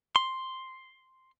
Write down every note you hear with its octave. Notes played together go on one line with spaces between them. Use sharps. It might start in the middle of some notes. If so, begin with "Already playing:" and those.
C6